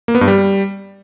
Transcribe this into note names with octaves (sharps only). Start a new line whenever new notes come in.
A#3
B3
G2
G3